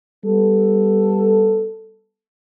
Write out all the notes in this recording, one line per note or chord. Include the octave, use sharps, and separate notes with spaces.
G3 B3 A4